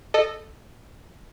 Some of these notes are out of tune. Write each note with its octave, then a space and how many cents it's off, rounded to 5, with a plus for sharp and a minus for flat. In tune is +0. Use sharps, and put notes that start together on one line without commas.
A4 +0 D#5 -20